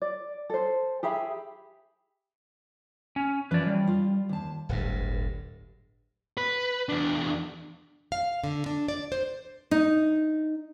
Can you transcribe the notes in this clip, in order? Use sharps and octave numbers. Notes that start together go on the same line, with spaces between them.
D5
A4 C5
G4 G#4 E5 B5
C#4
E3 F3 C#4 B4 D5
G3
F4
D#2 A5
D1 G1 G2
B4
E2 D4
F5
D3
D4
D5
C5
D#4